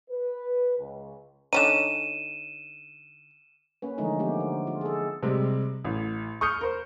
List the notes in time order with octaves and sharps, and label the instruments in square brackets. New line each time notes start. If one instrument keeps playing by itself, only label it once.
[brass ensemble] B4
C#2
[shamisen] D3 C#4 D#4 [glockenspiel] D#7 E7
[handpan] A#3 C#4 B4
D3 E3 F3 G#3 A3 D#4
F3 A#3 B3 G4
D3
F4
G#4 A4
[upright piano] C3 G3 G#3 C4
A1
C#6 D#6 F6 G6 C#7
A#4 C5